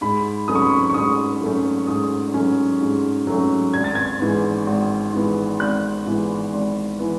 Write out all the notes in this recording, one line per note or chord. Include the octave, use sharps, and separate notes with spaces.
G#2 B5
F#3 A3 C#4 D#6
C#6
B5
C#6
C#6
G#2 D#6
F#3 A3 C#4
G#2 D#6
F#3 A3 C#4
G#2
F#3 A3 C#4
G#1 G#6
A6
G#6
G#2 E3 B3
G#1
G#2 E3 B3
G#1 F#6
G#2 E3 B3
G#1
E3 B3